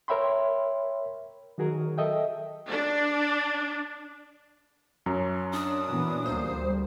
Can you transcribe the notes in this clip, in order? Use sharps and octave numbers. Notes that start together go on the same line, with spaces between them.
A#4 C#5 E5 G5 B5 C6
D#3 F#3 F#4 G#4 A#4
A4 D#5 E5 G5
D4
F#2 F#3 A#5
D4 D#6
A#2 E3 B3
D2 G3 A#3 C5